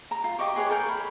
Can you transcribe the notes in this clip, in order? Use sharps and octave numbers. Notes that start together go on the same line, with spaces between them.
A#5
F4
G4 D#5 C#6 D6
G#4 B4 C#5 G#5
A4 A#4 G5
B5